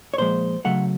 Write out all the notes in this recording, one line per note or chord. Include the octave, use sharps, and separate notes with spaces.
C#5
A#2 F3 G#3 C5
C#3 F#3 A3 F#5